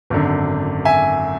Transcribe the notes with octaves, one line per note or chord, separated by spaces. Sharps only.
G#1 F#2 D3
E5 G#5